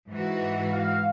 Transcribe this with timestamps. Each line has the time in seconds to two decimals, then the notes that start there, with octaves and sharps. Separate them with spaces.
0.11 G#2 E3 F#4
0.71 F5